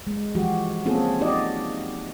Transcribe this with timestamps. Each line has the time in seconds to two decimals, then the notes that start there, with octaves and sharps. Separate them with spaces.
0.07 G#3
0.35 E3 F3 G#3 F#4 G4
0.85 A#3 C4 C#4 F4 G#4 A4
1.21 C#4 D#4 F#4 G4 D5 D#5